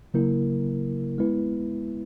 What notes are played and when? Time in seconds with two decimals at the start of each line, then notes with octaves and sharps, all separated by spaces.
0.14 C#3 F#3 A#3 E4 A#4
1.18 G#3 B3 E4 B4